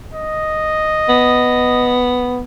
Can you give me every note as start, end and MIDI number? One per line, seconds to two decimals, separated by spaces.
0.13 2.07 75
1.08 2.40 59